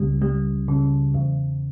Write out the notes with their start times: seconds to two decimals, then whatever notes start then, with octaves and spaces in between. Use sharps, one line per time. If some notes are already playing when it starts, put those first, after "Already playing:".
Already playing: C#2 C#3 G3
0.22 G3
0.68 C#3
1.14 E2